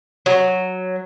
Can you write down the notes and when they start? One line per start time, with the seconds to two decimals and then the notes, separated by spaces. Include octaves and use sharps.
0.26 F#3